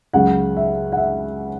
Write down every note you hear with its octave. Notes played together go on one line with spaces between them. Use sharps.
C#2 C#3 F#3 F#5
E5
F#5
E5